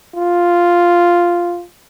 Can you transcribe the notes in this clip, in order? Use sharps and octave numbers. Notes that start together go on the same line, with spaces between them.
F4